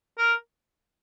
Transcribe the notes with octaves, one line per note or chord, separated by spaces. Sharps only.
A#4